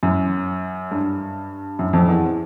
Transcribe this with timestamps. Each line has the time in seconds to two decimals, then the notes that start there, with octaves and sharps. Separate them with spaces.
0.03 F#2
0.91 G2
1.79 F#2
1.93 F2
2.08 E2